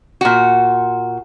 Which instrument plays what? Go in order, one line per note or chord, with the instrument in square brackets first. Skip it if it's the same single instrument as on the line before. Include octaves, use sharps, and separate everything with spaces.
[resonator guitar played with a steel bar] A#2 F#4